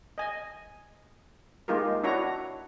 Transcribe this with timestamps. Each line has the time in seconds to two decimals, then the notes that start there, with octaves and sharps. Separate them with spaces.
0.18 D#5 G#5
1.68 G#3 A#3 D#4 F4 G4 A#4
2.04 D4 E4 F#4 C#5 A#5